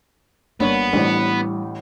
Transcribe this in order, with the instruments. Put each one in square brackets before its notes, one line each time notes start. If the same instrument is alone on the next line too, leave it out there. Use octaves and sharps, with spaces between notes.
[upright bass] G1 G3 [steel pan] A#3 D4 C#5 [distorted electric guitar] B3
[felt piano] A1 A2 [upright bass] G3 [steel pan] D4 C5 D#5